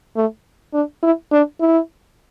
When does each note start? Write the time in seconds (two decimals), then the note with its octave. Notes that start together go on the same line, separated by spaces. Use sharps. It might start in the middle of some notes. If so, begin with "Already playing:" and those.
0.16 A3
0.74 D4
1.03 E4
1.32 D4
1.60 E4